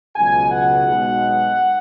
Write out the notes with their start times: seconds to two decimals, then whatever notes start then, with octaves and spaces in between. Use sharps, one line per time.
0.16 C#2 B2 F#3 G#5
0.52 F#5
0.87 B1 B2 G#3